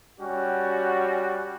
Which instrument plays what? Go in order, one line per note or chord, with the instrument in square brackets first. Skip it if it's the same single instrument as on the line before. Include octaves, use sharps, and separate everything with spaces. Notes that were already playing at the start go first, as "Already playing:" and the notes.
[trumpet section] G3 C#4 F#4